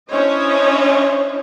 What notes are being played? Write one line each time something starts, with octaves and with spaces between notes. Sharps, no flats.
C#4 D4 E4 C5 C#5 D#5